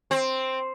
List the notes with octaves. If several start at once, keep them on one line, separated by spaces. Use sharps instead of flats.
C4